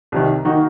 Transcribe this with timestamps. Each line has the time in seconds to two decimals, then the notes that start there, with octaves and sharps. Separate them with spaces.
0.12 C2 C3 D#3
0.45 D#3 A#3 D#4 F#4